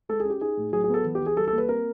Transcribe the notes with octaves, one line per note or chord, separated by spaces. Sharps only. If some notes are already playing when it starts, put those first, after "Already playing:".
G#3 A4
G#4
C#4 G4
D#4 G#4
A2
F#3 G#4
G#4
B3 A4
E3
G4
E3
G#4
G3 A4
A4
A#3
B4
C4 A#4